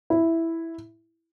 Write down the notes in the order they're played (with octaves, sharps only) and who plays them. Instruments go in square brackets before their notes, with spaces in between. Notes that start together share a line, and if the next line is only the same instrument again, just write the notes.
[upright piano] E4